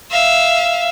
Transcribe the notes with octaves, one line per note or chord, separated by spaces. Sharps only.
E5 F5